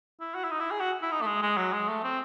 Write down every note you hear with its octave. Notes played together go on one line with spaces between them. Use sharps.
E4
F#4
E4
D#4
E4
G#4
F#4
E4
D#4
A3
G#3
G#3
F#3
G#3
A3
C4